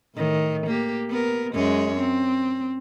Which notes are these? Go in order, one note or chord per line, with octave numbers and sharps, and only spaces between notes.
A2 D#3
A#3 G4
B3 A#4
F#2 G#3 C#5
C4